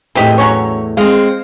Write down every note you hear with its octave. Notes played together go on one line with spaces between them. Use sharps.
E2 A2 C4 G4 D#5
F#3 C#4 C#5
G#3 C4 F5